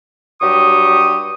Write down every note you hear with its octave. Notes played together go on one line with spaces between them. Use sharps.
G2 F#3 G4 C#6 D#6